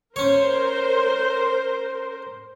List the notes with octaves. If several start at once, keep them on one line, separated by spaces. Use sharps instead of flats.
C#4 A#4 C5 C#5